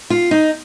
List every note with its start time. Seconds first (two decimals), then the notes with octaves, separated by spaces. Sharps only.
0.10 F4
0.31 D#4